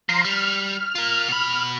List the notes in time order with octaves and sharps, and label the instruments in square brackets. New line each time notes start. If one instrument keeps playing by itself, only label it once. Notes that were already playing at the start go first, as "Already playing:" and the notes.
[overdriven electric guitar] F3 [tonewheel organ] A#5 C6
[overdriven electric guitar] G3 [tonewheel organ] F6
[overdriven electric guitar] F4 A#4
B2 B5